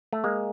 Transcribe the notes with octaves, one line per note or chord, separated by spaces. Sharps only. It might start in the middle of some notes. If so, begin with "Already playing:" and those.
A3
G#3 A#3